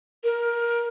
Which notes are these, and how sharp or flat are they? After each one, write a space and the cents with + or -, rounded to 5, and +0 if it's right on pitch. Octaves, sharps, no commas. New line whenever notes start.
A#4 +20